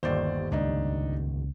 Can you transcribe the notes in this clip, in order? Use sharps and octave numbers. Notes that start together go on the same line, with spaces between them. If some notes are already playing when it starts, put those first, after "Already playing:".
G1 D#2 C5 D5
C#2 D4 D#4